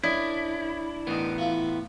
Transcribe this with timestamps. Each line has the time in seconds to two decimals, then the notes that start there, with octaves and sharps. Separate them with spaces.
0.04 C#4 D4 E4 A#4 D#5
1.07 A2 E3 B3 D#4 A#4
1.38 E4 F4 A4